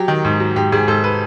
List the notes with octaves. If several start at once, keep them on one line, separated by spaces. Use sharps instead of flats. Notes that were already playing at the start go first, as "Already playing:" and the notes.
Already playing: F#3 G4
D#3
G#2
F#3
G#2 G4
G#2 G#4
G#2 A4
B4